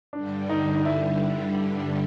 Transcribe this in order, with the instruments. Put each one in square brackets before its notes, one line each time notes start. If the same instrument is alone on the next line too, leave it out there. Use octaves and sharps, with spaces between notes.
[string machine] G2 D3 G3 [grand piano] D4
[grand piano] D#4
D#4
E4